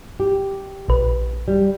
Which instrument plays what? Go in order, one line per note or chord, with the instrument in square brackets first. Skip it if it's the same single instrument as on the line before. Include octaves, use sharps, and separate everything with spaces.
[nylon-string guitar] G4
[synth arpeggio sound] A#1 B4
[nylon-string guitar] G3